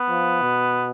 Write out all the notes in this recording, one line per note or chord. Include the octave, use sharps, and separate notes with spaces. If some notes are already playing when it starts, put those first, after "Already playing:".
Already playing: B3
F3
B2